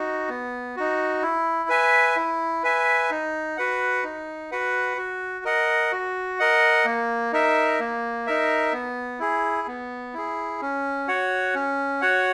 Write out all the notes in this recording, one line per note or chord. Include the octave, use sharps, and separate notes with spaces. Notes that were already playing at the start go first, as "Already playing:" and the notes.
Already playing: D#4 F#4
B3
D#4 F#4
E4
B4 E5 G#5
E4
B4 E5 G#5
D#4
F#4 B4 F#5
D#4
F#4 B4 F#5
F#4
A#4 D#5 F#5
F#4
A#4 D#5 F#5
A#3
D#4 A#4 E5
A#3
D#4 A#4 E5
B3
E4 G#4
B3
E4 G#4
C#4
F#4 C#5 F#5
C#4
F#4 C#5 F#5